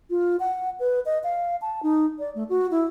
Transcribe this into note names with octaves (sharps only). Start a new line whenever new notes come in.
F4
F#5
B4
D#5
F5
A5
D#4
D5
A3
F#4
E4